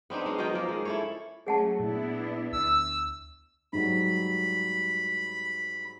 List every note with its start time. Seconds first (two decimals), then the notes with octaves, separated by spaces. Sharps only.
0.10 B3 C4 D4 D#4
0.26 G#3 C#4
0.38 D#3 F#3 D#5 G5
0.53 F3 A#3
0.69 G#3
0.85 E4 A4 C#5
1.47 F#3 A3 C#4 G#4 F#5 A5
1.80 A#2 B3 D4 E4
2.52 D2 E6
3.73 G#2 F#3 G3 B5